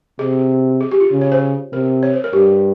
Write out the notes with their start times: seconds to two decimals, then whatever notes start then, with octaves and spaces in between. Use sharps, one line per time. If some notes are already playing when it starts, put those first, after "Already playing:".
0.19 C3 G#4
0.81 G#4
0.92 G4
1.01 F4
1.12 C#3
1.21 C#5
1.32 C5
1.72 C3 A#4
2.03 C#5
2.14 C5
2.24 A#4
2.33 G2 G4